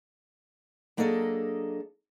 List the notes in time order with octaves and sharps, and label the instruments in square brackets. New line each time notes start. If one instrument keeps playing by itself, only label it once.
[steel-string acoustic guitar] F#3 A#3 D4 G#4 A4 D#5